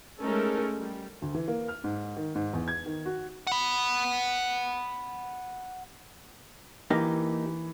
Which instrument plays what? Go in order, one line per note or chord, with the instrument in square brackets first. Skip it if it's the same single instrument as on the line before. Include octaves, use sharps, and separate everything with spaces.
[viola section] G#3 A3 C#4 D#4 A4 A#4
G3
[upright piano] D2
E3
A#3
F6
G#2
D#3
G#2
E2
G#6
D#3
F#4
[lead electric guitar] F#5 B5
[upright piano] E3 [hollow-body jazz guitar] A#3 D#4 G4